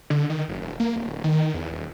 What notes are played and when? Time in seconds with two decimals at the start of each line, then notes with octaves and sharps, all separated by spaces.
0.10 D3
0.30 D#3
0.48 F#1
0.62 E1
0.80 A#3
0.96 D1
1.24 D#3
1.54 E2
1.72 D#1